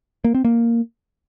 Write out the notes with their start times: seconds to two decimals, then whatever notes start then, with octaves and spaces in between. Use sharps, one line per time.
0.24 A#3
0.35 C4
0.45 A#3